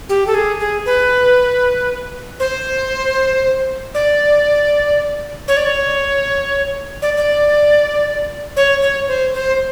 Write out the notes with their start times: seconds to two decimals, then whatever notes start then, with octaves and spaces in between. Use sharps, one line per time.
0.09 G4
0.27 A4
0.34 G#4
0.60 G#4
0.86 B4
2.40 C5
3.94 D5
5.48 C#5
5.57 D5
5.66 C#5
7.02 D5
7.17 D5
8.57 C#5
8.82 C#5
9.08 C5
9.34 C5